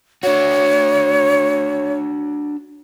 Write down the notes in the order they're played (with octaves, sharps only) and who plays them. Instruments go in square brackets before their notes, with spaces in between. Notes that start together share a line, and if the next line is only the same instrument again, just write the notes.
[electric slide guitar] D4 F#4 [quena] C#5